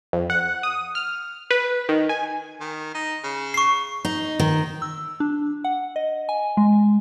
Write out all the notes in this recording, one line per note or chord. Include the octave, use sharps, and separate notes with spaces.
F2
F#5
D#6
F6
B4
D#3
G#5
D#3
D#4
C#3
C#6 C7
D#4
D#3
E6
D4
F#5
D#5
G#5
G#3